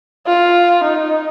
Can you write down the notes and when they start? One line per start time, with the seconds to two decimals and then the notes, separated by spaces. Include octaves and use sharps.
0.27 F4
0.83 D#4